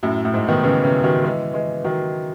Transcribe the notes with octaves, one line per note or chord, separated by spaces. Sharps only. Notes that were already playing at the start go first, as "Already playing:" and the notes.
F#2 A2
A2
G#2
B2 D#3
C#3 E3
C#3 E3
D#3 F#3
E3 G#3
E3 G#3
D#3 F#3